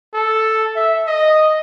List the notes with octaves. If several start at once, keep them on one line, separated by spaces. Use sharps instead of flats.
A4
E5
D#5